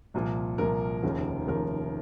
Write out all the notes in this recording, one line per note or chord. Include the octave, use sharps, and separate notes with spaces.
C2 A#2 F3
C2 A#2 F3 A#4
F1 D#2 C#3 F3
F1 D#2 C#3 F3 A#4